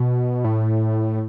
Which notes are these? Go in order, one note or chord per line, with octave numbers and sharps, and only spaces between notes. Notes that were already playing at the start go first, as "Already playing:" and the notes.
Already playing: B2
A2